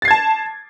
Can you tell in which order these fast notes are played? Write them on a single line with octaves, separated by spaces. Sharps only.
A6 C7 G#6 A5